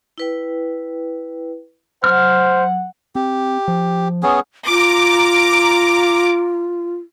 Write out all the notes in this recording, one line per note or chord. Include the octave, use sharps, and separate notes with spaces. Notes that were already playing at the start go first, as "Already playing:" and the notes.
E4 B4 G5
F#3 C5 F#5 F6
C4 G4
F3
B3 C#4 G#4
F4 A#5 D6